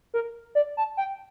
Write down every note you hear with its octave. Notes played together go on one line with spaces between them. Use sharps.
A#4
D5
A5
G5